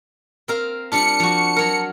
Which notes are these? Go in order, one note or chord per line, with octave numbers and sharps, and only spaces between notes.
C4 A#4 F5
G3 D4 F4 A5 C#7
F3 F#4
F#3 A#4